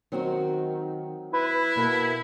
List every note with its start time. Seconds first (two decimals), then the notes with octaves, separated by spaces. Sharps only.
0.12 D#3 F#3 C4 F#4
1.33 E4 B4
1.76 B2 A#3 A4